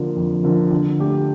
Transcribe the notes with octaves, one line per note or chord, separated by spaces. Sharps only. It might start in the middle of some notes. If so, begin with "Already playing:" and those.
Already playing: D3 F3 A#3
F2
D3 F3 A#3
D3
A3 D4 G4